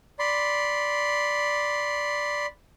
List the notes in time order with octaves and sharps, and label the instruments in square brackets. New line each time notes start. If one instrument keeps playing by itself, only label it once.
[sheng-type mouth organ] D5 B5 C6